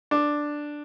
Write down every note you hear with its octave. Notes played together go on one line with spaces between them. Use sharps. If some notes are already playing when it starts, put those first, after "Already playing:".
D4